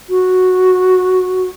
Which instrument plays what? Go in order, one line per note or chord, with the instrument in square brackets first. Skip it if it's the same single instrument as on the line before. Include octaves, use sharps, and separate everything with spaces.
[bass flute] F#4